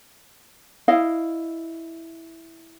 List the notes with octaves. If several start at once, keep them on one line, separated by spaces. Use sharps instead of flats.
E4 D#5 F5